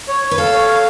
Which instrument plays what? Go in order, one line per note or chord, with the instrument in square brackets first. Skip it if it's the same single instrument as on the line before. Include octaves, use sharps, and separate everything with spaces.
[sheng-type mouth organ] C#5
C#5
[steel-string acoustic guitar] B4
[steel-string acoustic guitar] A4 [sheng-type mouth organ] F5
[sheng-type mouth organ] C#5
F5